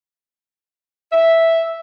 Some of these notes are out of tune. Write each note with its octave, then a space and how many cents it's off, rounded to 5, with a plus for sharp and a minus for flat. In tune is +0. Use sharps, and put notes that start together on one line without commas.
E5 -5